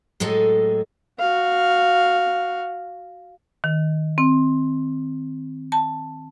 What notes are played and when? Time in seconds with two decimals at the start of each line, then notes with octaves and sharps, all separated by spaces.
0.20 A2 F#3 G#3 A4 D#5
1.20 F#4 F5
3.64 D#3
4.18 C4
5.72 A5